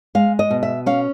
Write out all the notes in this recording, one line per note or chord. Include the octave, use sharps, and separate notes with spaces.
G#3 F5
D#5
B2
E5
C#4 F5